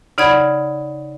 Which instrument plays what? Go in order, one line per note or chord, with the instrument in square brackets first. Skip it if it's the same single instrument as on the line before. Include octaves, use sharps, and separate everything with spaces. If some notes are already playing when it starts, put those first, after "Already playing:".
[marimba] C#3 D#4 D5 F#5 B5 G#6